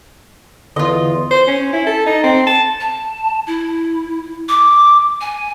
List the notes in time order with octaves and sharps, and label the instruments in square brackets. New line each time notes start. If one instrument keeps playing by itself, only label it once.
[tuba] E2 [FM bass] D3 [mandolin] F4 D#5
[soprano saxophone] C5
C#4
E4
A4
D#4
C4
A5
[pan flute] A5
E4
D6
G#5